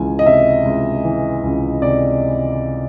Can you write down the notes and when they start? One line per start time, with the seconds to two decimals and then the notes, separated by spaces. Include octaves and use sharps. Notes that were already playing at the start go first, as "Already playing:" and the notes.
Already playing: C#2 E3 G#5
0.19 D#5
0.26 C3 E5
0.65 C#2
1.04 E3
1.44 C#2
1.82 C3 D5